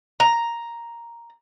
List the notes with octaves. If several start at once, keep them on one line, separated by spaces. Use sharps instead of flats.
A#5